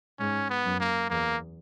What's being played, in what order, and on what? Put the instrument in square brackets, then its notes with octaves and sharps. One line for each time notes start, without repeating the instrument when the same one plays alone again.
[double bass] G#2 [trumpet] C#4
[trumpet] B3
[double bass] F#2
[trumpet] A#3
[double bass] E2 [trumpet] A#3